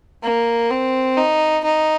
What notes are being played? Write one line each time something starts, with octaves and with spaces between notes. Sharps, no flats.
A#3
C4
D#4
D#4